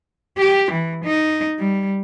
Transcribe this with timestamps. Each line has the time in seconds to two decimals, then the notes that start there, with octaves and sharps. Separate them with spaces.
0.38 G4
0.72 E3
1.05 D#4
1.59 G3